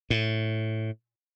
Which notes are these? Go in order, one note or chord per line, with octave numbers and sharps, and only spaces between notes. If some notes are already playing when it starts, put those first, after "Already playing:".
A2